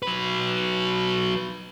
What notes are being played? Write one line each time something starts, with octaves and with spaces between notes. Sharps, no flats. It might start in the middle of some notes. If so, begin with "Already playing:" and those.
F#3 B4